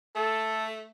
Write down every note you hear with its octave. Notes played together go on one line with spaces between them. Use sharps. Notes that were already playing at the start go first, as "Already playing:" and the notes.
A3 A4